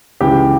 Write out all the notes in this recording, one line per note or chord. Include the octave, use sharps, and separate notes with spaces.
C#2 C#3 E3 G4